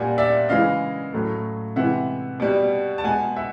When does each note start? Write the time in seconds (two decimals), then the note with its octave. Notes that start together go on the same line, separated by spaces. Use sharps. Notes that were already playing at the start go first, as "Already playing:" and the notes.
Already playing: A#2 G3 F#5 G#5
0.18 D5 E5
0.49 C#3 E3 G#3 D#5 F5
1.13 A2 F#3 A3
1.76 C3 E3 G#3 E5 F#5
2.40 B2 G3
2.98 A5
3.04 B2 G#3 F#5 G#5
3.37 E5 F#5